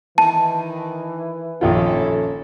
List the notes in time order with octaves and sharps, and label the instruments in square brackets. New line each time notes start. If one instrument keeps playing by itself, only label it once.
[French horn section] D#3 [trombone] E3 [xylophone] A5
[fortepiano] A#1 D#3 F4 [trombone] C#4 [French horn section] E4 A4